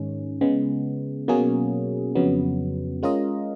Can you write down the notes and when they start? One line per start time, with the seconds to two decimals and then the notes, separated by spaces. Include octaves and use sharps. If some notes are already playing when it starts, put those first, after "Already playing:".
Already playing: G#2 D#3 G#3 C#4
0.41 C#3 G#3 B3
1.28 B2 F#3 A#3 C#4 G#4
2.15 F2 C#3 F#3 B3
3.03 G#3 C#4 F4 A#4 D#5